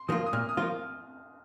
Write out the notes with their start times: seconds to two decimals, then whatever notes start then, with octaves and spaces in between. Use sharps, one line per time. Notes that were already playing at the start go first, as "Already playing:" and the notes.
Already playing: C6
0.08 F3 A#3 F4 D#6
0.26 D#6
0.33 A#2 F6
0.49 D#6
0.57 F3 A#3 F4